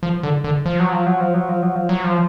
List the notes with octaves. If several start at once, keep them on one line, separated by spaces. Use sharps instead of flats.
F3
D3
D3
F3
F#3
F3
F#3
F3
F#3
F3
F#3
F3
F#3
F3